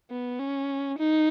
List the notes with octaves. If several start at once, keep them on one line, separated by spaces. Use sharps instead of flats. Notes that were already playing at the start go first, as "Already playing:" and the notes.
B3
C#4
D#4